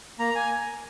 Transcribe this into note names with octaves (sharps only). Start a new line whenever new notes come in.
A#3 A#5
G#5